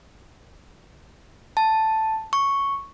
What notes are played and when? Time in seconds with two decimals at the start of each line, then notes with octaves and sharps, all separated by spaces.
1.57 A5
2.33 C#6